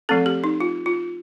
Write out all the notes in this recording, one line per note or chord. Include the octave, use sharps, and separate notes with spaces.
F3 A3 C4 A4
G4
D#4
F4
F4